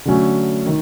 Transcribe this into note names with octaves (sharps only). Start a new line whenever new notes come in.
D3 F#3 A3 C#4
D#3